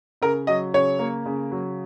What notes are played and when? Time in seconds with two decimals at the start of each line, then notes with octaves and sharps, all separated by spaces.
0.22 C#3 A#4
0.47 F#3 D#5
0.74 C#3 C#5
0.99 A#3
1.26 C#3
1.52 F#3